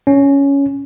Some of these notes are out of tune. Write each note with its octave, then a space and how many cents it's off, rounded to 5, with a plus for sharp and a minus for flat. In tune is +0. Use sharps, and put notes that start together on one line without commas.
C#4 +10